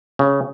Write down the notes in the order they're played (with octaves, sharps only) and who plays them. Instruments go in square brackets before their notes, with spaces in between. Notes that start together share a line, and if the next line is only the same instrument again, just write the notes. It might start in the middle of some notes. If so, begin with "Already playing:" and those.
[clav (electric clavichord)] C#3